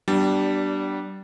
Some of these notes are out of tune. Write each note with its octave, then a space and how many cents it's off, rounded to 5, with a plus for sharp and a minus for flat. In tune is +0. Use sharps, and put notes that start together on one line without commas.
G3 -25 B3 -20 D4 +0